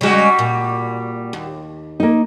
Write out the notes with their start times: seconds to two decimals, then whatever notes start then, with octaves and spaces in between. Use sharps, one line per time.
0.01 C#3 G3 G#3 F#4
0.39 A#2
1.33 D#2
2.00 A#3 D#4